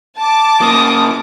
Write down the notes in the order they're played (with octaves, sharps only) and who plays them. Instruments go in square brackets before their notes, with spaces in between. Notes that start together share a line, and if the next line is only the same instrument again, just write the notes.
[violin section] A5 D6
[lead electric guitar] C#3 A#3 [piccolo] D#6